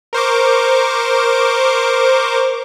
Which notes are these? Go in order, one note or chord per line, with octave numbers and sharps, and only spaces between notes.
A#4 C5 C#6 D6